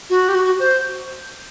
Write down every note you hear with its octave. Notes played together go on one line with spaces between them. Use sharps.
F#4
G4
F#4
C5